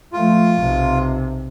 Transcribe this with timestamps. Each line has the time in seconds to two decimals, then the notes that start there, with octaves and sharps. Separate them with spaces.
0.13 F3 A3 F4
0.60 B1 C3